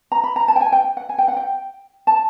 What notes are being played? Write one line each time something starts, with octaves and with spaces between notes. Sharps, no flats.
A#5
B5
A#5
A5
G5
G#5
G5
F#5
G#5
G5
F#5
G5
A5